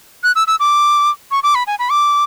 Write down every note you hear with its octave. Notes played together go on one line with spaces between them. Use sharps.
F#6
E6
E6
D6
C#6
D6
B5
G#5
B5
D6